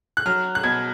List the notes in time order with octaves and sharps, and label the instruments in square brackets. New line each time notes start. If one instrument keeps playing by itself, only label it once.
[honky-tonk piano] F#6
F#3 F6
F#6
B2 G#6